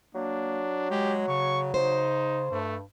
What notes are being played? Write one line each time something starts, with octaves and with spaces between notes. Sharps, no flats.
F#3 A#3 D4
G#3 G4
C#3 C#6
C#3 D#4 C5
G2 A3